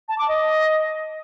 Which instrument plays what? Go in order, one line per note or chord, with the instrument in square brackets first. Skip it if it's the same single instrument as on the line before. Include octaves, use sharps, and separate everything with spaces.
[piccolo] A5
D6
D#5